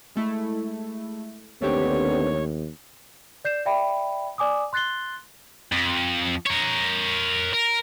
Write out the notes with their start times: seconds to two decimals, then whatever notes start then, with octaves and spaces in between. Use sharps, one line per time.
0.16 G#3 A3 E4
1.62 D#2 D3 A3 B3 C4 D4 G4 C#5
3.45 D5 G6 C7 E7
3.66 D5 E5 G5 B5
4.38 D5 G#5 D6 D#6
4.73 C6 F#6 A6 C7 G7
5.72 F2
6.46 A#4 C#5
7.53 A#4